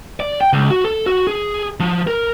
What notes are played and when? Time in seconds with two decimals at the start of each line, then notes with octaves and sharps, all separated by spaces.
0.20 D5
0.41 G5
0.53 C#2
0.70 F#4
0.84 A4
1.06 F#4
1.27 G#4
1.80 F3
2.07 A#4